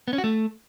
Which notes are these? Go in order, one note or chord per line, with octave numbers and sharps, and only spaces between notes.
B3
C#4
F#4
A3